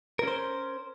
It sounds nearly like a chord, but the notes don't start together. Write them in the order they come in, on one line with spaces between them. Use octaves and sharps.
A#4 C#4 C5